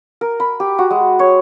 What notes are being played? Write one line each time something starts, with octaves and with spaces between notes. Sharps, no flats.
A#4
B5
G4
F#4
G#3
C#5